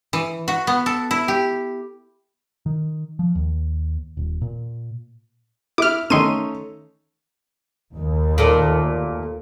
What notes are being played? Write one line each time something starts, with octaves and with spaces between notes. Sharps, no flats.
E3
F#4
B3
A4
E4
G4
D#3
F3
D#2
D#1
A#2
E4 D6 F6
D#3 A3 C#4 D#4 C6 D#7
D#2
A#2 A3